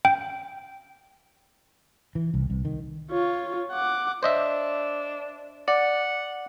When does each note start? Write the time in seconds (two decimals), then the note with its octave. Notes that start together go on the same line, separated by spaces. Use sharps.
0.05 G5
2.15 E3
2.34 C2
2.50 C2
2.65 D#3
3.11 F4 C#5
3.72 F#5 D6
4.23 D4 C5 D#5 E5
5.68 D5 F#5